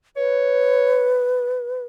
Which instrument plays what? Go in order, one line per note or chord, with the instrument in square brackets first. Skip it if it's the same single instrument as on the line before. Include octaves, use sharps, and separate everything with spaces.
[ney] B4 [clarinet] C#5